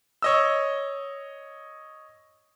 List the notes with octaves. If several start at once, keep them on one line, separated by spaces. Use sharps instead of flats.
C#5 D#5 E6